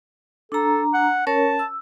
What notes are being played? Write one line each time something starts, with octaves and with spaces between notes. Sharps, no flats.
D4 A4 A#5
F#5
C#4 A#4 C#5 A5
E6